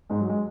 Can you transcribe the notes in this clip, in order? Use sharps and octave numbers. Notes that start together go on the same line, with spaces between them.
G#2 G#3
F#3
G#3